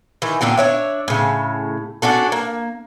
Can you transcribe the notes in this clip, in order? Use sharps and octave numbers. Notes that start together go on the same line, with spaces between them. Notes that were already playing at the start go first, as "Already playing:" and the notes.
D#3 E3
A#2 D3 D4 G5
D4 C#5 E5
A2 C#3
C#4 D4 F#4 A4
A#3